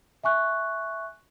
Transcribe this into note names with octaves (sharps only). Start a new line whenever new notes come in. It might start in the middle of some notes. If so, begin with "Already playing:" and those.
E5 G#5 C#6 F#6